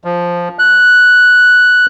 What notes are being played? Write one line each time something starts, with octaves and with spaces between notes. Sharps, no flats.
F3
F#6